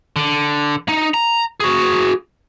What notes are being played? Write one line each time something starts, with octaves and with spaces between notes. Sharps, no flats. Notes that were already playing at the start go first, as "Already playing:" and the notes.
D3
D#4
A#5
F#4 G#4